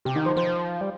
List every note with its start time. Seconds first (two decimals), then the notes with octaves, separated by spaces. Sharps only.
0.05 C3 G4
0.15 D#3 D#4
0.26 F3 C5
0.36 F3 C5
0.47 C5
0.81 G3